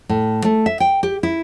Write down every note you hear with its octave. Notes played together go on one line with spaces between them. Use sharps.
A2
A3
E5
G5
G4
E4